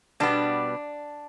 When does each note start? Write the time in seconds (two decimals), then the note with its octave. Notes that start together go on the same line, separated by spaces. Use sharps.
0.20 B2 G3 B3 D4